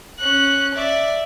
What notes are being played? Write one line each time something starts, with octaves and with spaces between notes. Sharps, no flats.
C#4 F#6
D5 E5